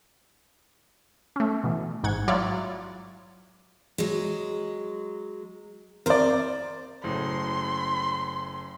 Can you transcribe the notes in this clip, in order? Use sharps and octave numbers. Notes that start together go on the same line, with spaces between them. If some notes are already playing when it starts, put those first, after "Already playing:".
A3 C#4
B2 E3
A1 G#2 F#5 G#6
F#3 E4 F4 C#5 D5
F#3 G#3
C4 A#4 C5 D5
F#1 A2 C6